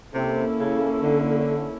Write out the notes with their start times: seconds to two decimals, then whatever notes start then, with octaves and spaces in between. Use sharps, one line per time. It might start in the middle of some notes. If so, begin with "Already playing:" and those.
0.14 C3 A#3 C#4 E4 A4
0.59 C#3
1.03 D3